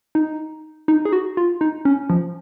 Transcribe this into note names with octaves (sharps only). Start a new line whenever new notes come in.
D#4
D#4
G#4
F#4
F4
D#4
C#4
F3